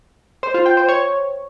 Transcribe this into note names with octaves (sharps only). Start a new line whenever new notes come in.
C5
F4
G5
C5
C#5